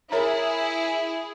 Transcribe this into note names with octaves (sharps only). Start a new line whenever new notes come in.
E4 G#4 A#4 C#5 A#5